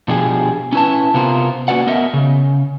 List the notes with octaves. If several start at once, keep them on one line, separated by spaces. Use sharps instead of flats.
B2 F3 D4 G4 G#4
C#4 E4 B4 A5
C3 B3 F4 A#4 C5
A#3 C#4 F#4 B4 D5 F#5
B3 A#4 D#5 E5
C#3